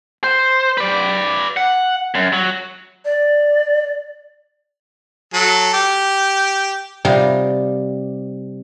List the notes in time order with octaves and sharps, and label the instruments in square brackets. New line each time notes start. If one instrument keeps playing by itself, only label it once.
[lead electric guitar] C5
B4 D5
F#5
F#2
F#3
[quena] D5
[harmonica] F#3 A4
G4
[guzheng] C3 G3 D#4 F4